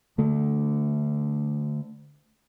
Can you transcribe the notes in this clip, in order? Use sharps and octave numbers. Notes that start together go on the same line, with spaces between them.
D3 A3